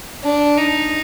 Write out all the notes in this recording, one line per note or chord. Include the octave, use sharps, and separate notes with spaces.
D4
D#4